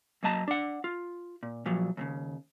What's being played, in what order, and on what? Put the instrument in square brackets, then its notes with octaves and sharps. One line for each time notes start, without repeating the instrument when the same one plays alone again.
[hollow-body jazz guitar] F#2 A#3 D#5 A5 A#5
D4 F#5
F4
A#2
A#2 F3 F#3
D#2 A2 C#3